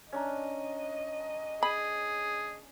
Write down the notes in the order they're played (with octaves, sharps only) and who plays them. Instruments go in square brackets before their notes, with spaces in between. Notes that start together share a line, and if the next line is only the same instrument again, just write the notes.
[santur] C#4 D4 A#5 [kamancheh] D#5
[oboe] G#4 [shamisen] B5